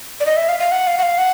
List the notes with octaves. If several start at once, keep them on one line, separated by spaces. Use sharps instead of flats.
D5
D#5
E5
F5
F5
F#5
F5
F#5
F5
F#5